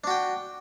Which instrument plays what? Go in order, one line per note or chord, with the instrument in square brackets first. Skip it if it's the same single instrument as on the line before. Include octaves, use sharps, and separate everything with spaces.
[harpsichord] D4
F#4
G5